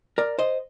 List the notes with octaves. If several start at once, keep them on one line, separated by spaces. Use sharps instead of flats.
A#4 D5
C5 D#5